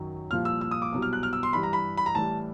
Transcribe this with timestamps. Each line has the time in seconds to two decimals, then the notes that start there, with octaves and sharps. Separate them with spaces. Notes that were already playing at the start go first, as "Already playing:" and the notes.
Already playing: F#2 D#3 F#3
0.31 C2 A#2 F3 F6
0.45 E6
0.61 E6
0.71 D#6
0.82 D6
0.92 C2 B2 F#3
1.02 F6
1.13 F#6
1.23 F6
1.33 E6
1.43 C6
1.53 G2 E3 G3 B5
1.63 A#5
1.73 B5
1.97 B5
2.06 A#5
2.15 A2 E3 G3 A5